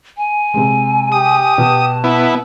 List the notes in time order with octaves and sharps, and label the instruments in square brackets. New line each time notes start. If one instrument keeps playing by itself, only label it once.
[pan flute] G#5
[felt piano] C3 G#3
[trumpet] G4 [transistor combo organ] D#6
[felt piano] B2 [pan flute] A5
[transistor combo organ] B3 E4